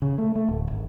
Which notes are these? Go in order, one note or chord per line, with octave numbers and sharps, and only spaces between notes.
C#3
A3
A3
D1
G#1